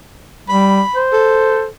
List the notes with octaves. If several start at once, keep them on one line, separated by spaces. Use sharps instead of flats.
G3 B5
C5
A4